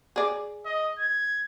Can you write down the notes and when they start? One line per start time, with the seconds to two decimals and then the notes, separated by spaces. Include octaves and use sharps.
0.16 G#4 D5
0.65 D#5
0.99 G#6